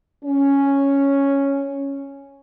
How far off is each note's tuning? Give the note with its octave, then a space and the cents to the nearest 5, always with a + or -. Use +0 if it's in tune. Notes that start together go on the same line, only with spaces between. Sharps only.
C#4 +0